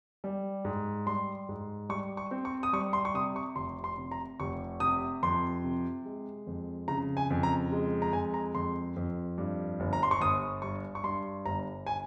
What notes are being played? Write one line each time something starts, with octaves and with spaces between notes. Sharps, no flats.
G3
G#2
G3 C6
G#2
G3 C#6
C#6
C4
C#6
D#6
G3 C#6
C6
C#6
C3 D#6
C#6
F1 C6
C6
C3
A#5
F1 C#6
C3 D#6
F2 C6
C3
G#3
F2
C#3 A#5
G#5
F2
A#5
G#3
A#5
F2 G#5
A#5
F2 C6
F2
G2
G1
A#5
C6
C#6
G1 D#6
G2 C#6
C#6
G2 C6
G1 A#5
G#5